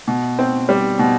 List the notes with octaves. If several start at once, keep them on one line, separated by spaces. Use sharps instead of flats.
B2
C4
G3
B2